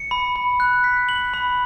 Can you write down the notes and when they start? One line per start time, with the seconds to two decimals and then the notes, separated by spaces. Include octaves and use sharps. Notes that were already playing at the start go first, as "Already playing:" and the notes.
Already playing: C#7
0.11 B5
0.36 B5
0.60 F#6
0.84 B6
1.09 F#7
1.34 B5